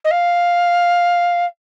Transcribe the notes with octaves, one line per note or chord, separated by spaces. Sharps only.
D#5
F5